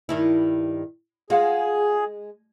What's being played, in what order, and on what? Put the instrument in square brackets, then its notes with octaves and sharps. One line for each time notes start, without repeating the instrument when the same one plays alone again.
[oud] G2 D#3 E4
[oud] G#3 [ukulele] F4 F5 F#5 [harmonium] G#4